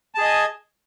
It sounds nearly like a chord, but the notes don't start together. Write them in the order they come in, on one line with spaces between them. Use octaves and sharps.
A5 G#4 D#5 G#5